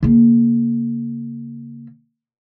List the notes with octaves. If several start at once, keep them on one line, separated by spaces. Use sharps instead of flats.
C#3 A#3